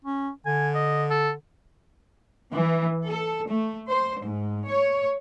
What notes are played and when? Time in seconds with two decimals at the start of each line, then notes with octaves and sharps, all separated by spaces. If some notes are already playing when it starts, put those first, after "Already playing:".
0.05 C#4
0.46 D3 G#5
0.75 D#5
1.10 A4
2.52 E3
3.05 A4
3.46 A3
3.89 C5
4.23 G#2
4.67 C#5